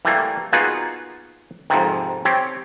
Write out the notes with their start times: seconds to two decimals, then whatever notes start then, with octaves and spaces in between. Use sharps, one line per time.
0.05 E3 G3 A3 A#3
0.53 A#3 B3 D#4 F4 F#4 G#4
1.70 F2 G#2 C3 D#3
2.25 C4 G4 C#5